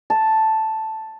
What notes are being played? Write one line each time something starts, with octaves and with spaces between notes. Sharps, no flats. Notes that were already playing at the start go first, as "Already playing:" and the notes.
A5